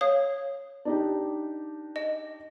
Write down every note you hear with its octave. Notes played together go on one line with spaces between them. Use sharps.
C#5 F5 D#6
D4 D#4 G4
D#5